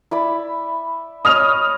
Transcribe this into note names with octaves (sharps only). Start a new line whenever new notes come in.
E4 D5 B5
C#5 D#5 D#6 F6 F7